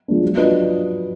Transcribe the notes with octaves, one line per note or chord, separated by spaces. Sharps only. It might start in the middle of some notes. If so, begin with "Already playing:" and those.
F3 G#3 D4
F#3
D4 F4 B4 D#5